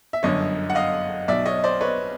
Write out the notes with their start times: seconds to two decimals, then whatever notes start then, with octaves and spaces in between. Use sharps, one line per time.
0.13 E5
0.23 G1 F#2 D3 C#5 D#5
0.70 F#5
0.75 D#5 F5
1.28 B1 B2 D5 E5
1.46 C#5 D#5
1.64 C5 D5
1.81 B4 C#5